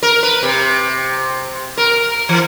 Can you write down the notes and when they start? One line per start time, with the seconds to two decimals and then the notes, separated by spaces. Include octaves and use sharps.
0.03 A#4
0.23 B4
0.43 C3
1.78 A#4
2.29 E3